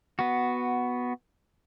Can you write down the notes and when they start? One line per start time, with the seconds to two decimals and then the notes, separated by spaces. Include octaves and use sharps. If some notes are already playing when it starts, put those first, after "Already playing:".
0.19 B3 F#4